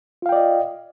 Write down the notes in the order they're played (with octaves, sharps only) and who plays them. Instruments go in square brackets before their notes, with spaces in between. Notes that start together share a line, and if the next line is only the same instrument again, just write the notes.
[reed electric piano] F4
F5
G5
D5
D#5